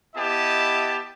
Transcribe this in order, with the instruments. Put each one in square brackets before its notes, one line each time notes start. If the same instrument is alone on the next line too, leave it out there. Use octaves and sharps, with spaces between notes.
[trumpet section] B3 E4 G4 D#5 A5